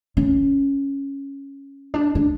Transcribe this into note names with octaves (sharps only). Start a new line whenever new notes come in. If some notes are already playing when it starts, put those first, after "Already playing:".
C#4
D4
D4